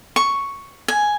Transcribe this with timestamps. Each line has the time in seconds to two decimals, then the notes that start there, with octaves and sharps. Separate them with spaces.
0.16 C#6
0.88 G#5